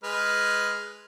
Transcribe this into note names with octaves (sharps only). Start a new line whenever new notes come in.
G#3 B4 F6